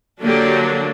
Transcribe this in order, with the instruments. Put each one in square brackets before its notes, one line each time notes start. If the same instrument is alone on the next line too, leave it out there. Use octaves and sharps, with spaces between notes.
[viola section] D3 F#3 A#3 D4 G4